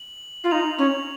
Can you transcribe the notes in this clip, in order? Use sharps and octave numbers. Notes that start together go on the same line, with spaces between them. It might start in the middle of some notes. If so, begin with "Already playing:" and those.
Already playing: F#7
F4
D#4 F7
C#4